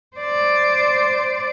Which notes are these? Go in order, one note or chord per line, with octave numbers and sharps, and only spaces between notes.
C5 D5